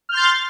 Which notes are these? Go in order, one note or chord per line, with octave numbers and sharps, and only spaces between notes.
C6 F6 G6 A6